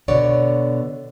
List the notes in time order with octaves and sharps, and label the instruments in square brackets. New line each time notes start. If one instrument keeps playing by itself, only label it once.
[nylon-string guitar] B2 D3 B3 C#5 D5